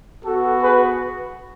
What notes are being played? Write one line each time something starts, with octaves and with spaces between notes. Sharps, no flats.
B3 F#4 A4
G#4 B4